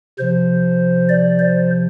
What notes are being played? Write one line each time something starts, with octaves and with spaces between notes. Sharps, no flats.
C3 F3 C5
D5
C5